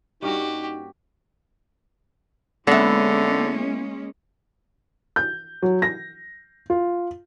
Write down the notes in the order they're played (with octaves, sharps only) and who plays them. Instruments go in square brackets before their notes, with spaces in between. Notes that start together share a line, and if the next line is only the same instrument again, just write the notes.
[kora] G2 A#3 C#4 [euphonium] D#4 [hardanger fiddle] F#4 G4
[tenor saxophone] D3 [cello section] G#3 A#3 C#4 [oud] B3 E4
[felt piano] G6
F#3
A#6
F4